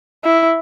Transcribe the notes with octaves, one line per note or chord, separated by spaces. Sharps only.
E4